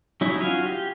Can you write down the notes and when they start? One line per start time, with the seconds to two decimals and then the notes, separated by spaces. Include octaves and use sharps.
0.21 F#3 C#4 D#4 E4
0.41 F4 F#4 F5 G#5
0.66 G4